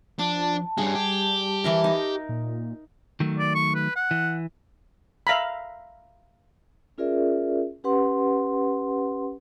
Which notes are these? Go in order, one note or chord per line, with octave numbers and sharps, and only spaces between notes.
F3 D4 A5
G2 G3 C#4 G#4
G4
E3 E4 A#4
D#4
A#2
D#3 F#3 A3
D5
C#6
B4
F#5
E3
E5 F5 A#5 B5
C#4 F4 G#4 A#4 D5 E5
C#4 G4 B4 F#5 C6